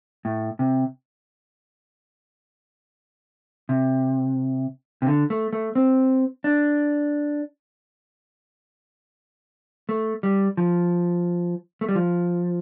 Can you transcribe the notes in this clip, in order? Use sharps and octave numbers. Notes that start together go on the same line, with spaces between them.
A2
C3
C3
C3
D3
A3
A3
C4
D4
A3
G3
F3
A3
G3
F3